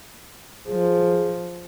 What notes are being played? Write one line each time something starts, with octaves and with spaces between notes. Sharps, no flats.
F3 G#4